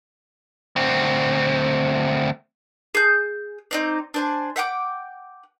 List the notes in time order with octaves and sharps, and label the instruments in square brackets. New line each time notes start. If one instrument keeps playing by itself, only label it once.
[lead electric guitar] D2 C4
[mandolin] G#4 G6
C4 D#4 D5
D4 C5 G#5
E5 F#5 G5 D6